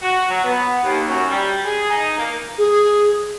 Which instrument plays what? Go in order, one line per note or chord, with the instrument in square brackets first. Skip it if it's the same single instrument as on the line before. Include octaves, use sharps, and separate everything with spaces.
[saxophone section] F#4
F#3
B3
D#2
F#2
G3
G#4
D#4
A#3
[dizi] G#4